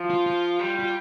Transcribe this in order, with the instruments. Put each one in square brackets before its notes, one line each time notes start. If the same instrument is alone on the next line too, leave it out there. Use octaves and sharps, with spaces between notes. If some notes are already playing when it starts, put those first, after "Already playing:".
Already playing: [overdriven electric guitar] F3
[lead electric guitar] F4
F4
[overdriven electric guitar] G3
[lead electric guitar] F4